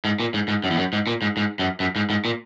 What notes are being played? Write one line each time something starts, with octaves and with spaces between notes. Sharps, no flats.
G#2
A#2
G#2
G#2
F#2
E2
F#2
G#2
A#2
G#2
G#2
F#2
F#2
G#2
G#2
A#2